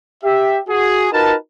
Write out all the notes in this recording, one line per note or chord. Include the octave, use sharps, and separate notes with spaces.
G4 E5
F#4 G#4
D#4 F4 F#4 A#4 B4 A5